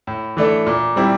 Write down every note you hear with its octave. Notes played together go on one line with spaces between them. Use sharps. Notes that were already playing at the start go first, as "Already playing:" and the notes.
A2
E3 A3 D4 A4
A#2
G3 C4 E4